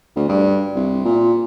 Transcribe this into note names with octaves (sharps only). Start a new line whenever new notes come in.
D2
G2
C2
A#2